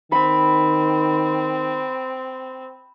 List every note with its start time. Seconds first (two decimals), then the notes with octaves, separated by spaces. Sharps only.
0.12 D#3 C4 B5